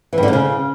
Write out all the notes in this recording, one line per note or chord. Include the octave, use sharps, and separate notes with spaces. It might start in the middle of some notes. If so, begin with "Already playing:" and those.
E3
G2
D3
C3
C#3